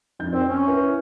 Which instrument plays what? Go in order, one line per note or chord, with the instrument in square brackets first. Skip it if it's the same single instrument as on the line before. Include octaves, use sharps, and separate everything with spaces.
[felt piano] F2 D#4 G6
[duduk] C4 [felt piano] C5
[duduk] C#4
[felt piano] E4 B4 E5